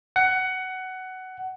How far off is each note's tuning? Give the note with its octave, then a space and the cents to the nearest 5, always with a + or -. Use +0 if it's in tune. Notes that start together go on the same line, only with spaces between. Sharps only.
F#5 +15